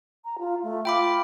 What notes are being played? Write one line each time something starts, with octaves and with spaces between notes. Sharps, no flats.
A#5
F4
A3
F4 G5 B5 D6